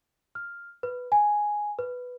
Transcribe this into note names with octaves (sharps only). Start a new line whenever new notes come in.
F6
B4
G#5
B4